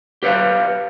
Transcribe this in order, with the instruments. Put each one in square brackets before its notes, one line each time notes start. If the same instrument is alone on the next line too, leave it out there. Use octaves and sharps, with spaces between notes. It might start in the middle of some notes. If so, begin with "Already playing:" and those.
[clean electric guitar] G4 B4 C#5 F5